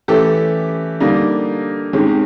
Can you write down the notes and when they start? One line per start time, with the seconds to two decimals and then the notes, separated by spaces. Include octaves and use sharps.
0.08 E3 A3 C#4 G4 A4
1.00 D3 G3 A#3 D#4
1.93 C3 D#3 G#3 C#4